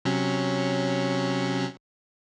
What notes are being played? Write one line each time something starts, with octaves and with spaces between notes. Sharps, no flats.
C3 F#3 C#4